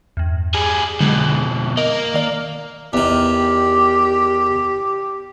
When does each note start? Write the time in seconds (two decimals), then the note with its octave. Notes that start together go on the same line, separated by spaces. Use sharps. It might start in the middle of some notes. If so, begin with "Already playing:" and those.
0.17 E2 G2
0.54 G3 G#4
1.01 F2 B2 D3 F#3 G#3
1.77 A#3 A#4 D#5
2.14 D#3 D5 F6
2.93 E2 D#3 G4